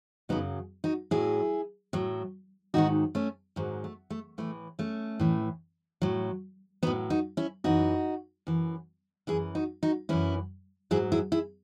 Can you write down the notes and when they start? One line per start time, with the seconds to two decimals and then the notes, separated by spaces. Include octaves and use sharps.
0.29 F#2 C#3 F#3 B3 D#4
0.84 D#4 F#4
1.11 A2 F#3 E4 G#4
1.93 A2 F#3
2.74 G#2 D#3 F#3 D#4 F#4
3.15 A3 C#4
3.56 G#2 D#3 F#3
3.84 A3
4.10 A3
4.38 A2 E3 A3
4.79 A3 C#4
5.20 A2 E3
6.02 A2 F#3
6.83 F#3 B3 D#4
6.87 A2
7.10 D#4 F#4
7.37 C#4 E4
7.64 F#2 E3 D#4 F#4
8.47 F#2 E3
9.27 F#2 E3 E4 G#4
9.55 D#4 F#4
9.83 D#4 F#4
10.09 F#2 E3 C#4 E4
10.91 G#2 F#3 E4 G#4
11.12 E4 G#4
11.32 E4 G#4